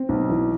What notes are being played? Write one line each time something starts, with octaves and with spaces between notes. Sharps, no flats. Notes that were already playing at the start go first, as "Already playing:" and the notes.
Already playing: C4
B1
E3